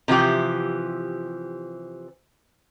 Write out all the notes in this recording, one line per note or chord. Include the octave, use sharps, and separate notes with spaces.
C3 E3 F3 G4